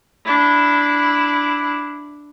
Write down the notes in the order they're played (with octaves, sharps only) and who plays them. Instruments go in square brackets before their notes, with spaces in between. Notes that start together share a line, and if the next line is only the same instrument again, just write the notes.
[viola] D4 E4